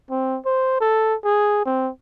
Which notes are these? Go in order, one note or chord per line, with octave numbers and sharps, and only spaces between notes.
C4
C5
A4
G#4
C4